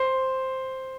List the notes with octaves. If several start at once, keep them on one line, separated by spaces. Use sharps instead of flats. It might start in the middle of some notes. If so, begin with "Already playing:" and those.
Already playing: C5